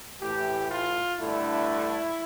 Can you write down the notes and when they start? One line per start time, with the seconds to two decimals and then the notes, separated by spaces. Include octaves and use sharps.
0.20 A2 E3 A3 G4
0.70 F4
1.18 G2 D3 A3 E4